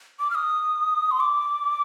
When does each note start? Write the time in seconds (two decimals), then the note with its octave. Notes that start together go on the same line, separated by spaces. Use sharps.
0.19 D6
0.30 F6
0.35 D#6
1.11 C6
1.20 D6